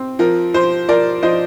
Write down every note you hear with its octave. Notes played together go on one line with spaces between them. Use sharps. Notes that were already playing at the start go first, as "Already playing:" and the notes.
Already playing: C4
F3 A#4
F3 C5
F3 A#4 D5
F3 C5 D#5